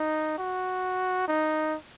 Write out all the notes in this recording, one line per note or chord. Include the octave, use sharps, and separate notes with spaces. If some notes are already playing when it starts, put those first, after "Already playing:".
Already playing: D#4
F#4
D#4